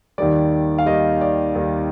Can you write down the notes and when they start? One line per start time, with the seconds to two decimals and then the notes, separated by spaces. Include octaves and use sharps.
0.18 D#2 D#3 G3 D5
0.78 F5
0.86 D#2 D#3 G3 D#5
1.21 D5
1.55 D#2 D#3 G3